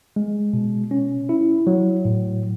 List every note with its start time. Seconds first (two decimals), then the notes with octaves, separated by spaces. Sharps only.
0.16 G#3
0.53 B2
0.91 C#4
1.29 E4
1.67 F#3
2.05 A2